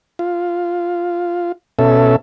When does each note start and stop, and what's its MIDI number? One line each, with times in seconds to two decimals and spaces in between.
0.19 1.52 65
1.79 2.16 47
1.79 2.16 61
1.79 2.16 69
1.79 2.16 76